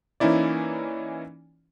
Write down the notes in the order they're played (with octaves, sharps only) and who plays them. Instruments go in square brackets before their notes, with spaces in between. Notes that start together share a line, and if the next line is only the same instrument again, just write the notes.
[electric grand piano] E3 A#3 C#4 D#4 E4 D5